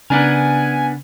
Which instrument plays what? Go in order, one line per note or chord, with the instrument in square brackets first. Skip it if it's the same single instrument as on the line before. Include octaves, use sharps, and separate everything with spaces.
[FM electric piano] C#3 [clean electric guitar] B3 D4 A#4 [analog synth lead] G#5